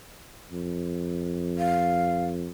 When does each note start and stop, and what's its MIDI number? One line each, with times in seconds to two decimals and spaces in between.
0.51 2.52 41
1.58 2.26 77